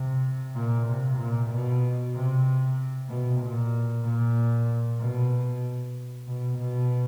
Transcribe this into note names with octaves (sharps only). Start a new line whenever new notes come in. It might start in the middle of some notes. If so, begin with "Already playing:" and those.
Already playing: C3
A#2
C3
A#2
B2
C3
B2
A#2
A#2
B2
B2
B2